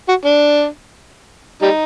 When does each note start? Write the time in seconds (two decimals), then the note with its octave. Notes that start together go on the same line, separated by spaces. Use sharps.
0.08 F#4
0.25 D4
1.62 G3 D#4